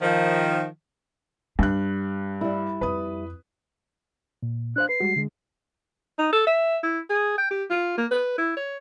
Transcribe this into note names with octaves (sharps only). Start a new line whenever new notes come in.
D#3 F3
G2 D4 F#6
G3 E4
F2 B4 D#6
A#2
D4 C5 F5 F#6
B4 C7
G3 G#3 F#4
D3 G#3
D#4
A4
E5
E4
G#4
G5
G4
F4
A#3
B4
E4
C#5